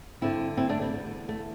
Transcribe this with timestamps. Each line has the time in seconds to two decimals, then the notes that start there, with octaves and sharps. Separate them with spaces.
0.21 G2 D3 C4 E4
0.57 C4 E4
0.69 A3 D4
0.81 G3 C4
0.93 E2 D3
1.29 A3